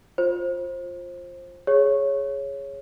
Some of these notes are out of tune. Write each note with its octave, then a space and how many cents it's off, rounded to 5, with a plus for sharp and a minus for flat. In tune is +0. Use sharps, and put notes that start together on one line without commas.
F4 +10 C5 +25
G#4 +0 C#5 +0